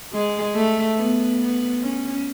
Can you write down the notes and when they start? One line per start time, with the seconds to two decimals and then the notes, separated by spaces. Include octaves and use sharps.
0.13 G#3
0.55 A3
0.97 B3
1.38 B3
1.81 C#4